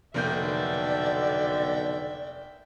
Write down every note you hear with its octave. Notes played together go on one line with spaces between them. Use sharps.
F1 B1 D3 A#3 D5 E5 G5 G6